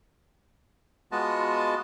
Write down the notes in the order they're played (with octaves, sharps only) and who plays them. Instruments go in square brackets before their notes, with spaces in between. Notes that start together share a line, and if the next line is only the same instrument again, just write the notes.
[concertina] G#3 B3 F4 F#4 D#5 A5